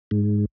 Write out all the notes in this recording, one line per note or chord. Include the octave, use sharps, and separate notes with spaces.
G#2